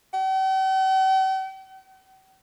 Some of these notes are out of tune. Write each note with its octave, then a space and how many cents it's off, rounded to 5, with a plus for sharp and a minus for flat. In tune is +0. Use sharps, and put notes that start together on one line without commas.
G5 -45